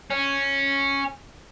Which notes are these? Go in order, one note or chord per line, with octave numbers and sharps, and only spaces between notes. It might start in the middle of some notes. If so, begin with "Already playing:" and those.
C#4